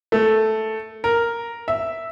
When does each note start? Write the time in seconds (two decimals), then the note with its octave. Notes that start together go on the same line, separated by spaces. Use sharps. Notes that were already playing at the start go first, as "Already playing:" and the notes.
0.12 A3
1.04 A#4
1.68 E5